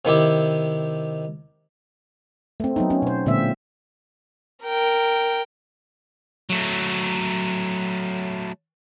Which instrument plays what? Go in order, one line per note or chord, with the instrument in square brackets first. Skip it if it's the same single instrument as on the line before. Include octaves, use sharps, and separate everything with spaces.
[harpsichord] C3 D#3 E4 G4
[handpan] A3 C4
F#3 B3 D#4
C#4
B2 C5
A#2 D3 G#3 C4 F4 E5
[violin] A#4 G5
[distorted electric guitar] F#3 A3